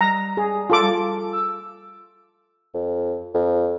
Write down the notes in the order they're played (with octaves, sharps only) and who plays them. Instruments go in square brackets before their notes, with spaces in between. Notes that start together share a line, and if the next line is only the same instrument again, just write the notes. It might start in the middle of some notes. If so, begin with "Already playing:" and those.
[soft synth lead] G3 [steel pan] A#5
[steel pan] G#4
F4 A4 D6
[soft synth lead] E6
[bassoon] F2
F2